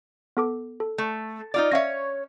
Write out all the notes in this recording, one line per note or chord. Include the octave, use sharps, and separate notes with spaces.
B3 A4 D6
A4
A3
D#4 F4 D5
C#4 C#5 E5 F5 A#6